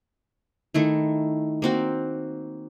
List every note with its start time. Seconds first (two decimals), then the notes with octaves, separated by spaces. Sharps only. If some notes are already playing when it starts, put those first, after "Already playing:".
0.74 D#3 A3 E4
1.62 A#3 C4 F#4